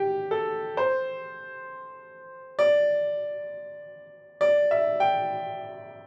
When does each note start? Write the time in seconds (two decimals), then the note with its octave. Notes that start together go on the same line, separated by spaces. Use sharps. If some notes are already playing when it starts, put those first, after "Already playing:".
Already playing: G4
0.31 A4
0.77 C5
2.59 D5
4.41 D5
4.71 E5
5.00 G5